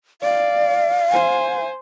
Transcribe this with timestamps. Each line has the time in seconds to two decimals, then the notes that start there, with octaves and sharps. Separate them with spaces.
0.22 D5 F5
1.11 C5 G#5